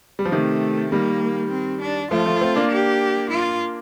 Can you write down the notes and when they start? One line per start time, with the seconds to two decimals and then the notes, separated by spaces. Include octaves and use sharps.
0.19 G3
0.26 F3
0.32 C3 D#3 A3
0.92 D#3 G3 A#3
1.51 C4
1.81 D4
2.11 F3 A3 F4
2.26 F3 A3
2.41 A3 C4
2.56 A#3 D4
2.71 G4
3.30 F4